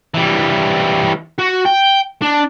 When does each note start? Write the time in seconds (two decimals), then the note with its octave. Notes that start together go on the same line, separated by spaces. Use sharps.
0.14 E3 G3
1.38 F#4
1.65 G5
2.22 D4